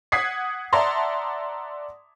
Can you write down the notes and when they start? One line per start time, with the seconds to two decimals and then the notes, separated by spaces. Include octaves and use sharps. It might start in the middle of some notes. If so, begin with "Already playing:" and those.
0.12 F#5 D#6 G#6 B6 C7
0.73 D5 E5 F#5 A5 A#5 C6